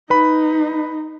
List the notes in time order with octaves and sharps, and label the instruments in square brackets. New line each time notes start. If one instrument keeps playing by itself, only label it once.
[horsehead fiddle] D#4 [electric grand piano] B4 B5